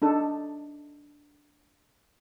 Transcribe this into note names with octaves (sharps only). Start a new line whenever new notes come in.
D4 D#4 A4